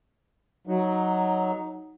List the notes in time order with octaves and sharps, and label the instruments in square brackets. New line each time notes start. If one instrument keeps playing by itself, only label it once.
[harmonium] F#3 [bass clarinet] D#4